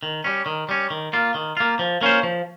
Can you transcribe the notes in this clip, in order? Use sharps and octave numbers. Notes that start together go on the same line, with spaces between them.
D#3
G3 C#4
D#3
G3 C#4
D#3
A#3 F4
D#3
A#3 F4
F3
A#3 C#4 F4 C5
F3